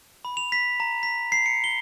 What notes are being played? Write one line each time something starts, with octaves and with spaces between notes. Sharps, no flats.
B5
F7
B6
A#5
B6
C7
C#7
G7